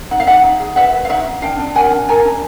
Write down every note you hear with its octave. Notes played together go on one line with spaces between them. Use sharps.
D#4 F#5
F5
D#4 E5 F#5
D#4
G#4
B4 E5 F#5
B4
F5
D#4 E5 F#5
D#4
D4 F5 G5
D4
A#4 F#5 G#5
D4
A#4 G#5 A#5
D4